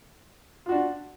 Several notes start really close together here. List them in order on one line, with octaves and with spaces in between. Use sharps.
F4 F#4 D4